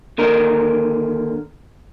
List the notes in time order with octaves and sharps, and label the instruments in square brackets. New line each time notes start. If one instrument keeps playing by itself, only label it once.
[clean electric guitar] D#2 D3 A#4